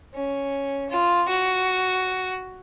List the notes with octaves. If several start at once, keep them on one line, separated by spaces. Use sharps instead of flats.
C#4
F4
F#4